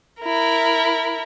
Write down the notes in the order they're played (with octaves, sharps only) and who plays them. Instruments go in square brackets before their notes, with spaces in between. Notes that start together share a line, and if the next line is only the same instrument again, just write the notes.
[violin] E4 A#4